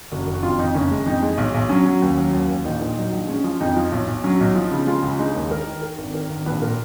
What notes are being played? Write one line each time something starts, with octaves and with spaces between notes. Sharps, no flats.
F#1 F#4
F#1
F#4
F2 F4
F2 D#4
F#1 C#4
G#3
F2 D#4
G#3
B1
B1
F#3 C#4
F#3
D#2
F#3
D#2
D#2
A#1 D#4
A#2
F#3 D#4
A#1
G#3 C#4
F3
F2 D#4
F3
B1
B1
F#3 C#4
B1 D#4
F3
C#3
G#3 F4
C#2
G#3 D#4
D#2
G#3 A#4
D#3
D#3 A#4
G#1
D#3 A#4
G#1
A#1 B4
A#2 A#4